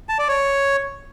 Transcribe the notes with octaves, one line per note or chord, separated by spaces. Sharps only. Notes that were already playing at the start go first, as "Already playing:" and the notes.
A5
D5
C#5